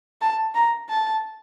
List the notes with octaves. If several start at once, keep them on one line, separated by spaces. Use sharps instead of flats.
A5
A#5
A5